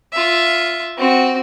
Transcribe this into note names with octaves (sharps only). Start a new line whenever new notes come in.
F4 E5
C4 F#4